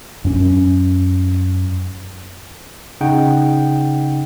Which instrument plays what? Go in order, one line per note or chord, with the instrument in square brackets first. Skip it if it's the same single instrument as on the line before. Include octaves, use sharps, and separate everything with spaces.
[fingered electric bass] F#2 C#4
[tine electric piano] C#3 D#4 F#5 G5